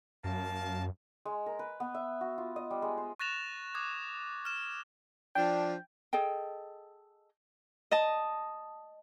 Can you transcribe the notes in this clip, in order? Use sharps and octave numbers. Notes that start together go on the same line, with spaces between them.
F#2 A#3 F5 A5
G#3
A#4
B4
B3
E5
F#4
F4
D#5
G3
G#3
C5
C#6 F#6 A6 A#6 E7 F7
D6 D#6 F#6 G#6
F6 E7
F3 D4 G5
G#4 A4 D#5 G5
D#5 A5